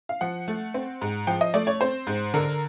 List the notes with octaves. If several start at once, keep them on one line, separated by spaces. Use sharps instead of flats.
F5
F3 F#5
A3
C4
G#2
F3 G5
D#5
A3 D5
C#5
C4 C5
G#2
D3 A#4